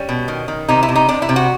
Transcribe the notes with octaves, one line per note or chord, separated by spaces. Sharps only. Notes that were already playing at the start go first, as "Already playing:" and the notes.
Already playing: G3 C#4
B2
D#3
D#3
C3 D#4
E4
C3
D#4
C3 D4
E4
C3
F#4